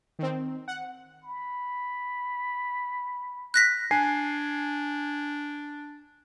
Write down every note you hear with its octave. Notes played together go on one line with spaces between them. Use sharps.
D#3 C4
F#5
B5
F#6 A#6 B6
D4 G#5 C7